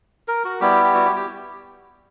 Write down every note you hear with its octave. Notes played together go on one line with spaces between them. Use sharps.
A#4
F#4
G3 B3 E4 G4
G4
F#4
G4
G4